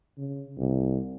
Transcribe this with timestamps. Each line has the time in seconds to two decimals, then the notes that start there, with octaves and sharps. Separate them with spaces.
0.18 C#3
0.58 C2